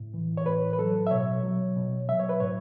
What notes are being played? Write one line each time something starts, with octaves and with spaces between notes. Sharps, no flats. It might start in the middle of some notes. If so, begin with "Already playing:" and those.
Already playing: A2
E3
C#5
A2 B4
B4
F#3 A4
E5
B2 C#5
F#3
B2
F#3 E5
C#5
B4
A2 C#5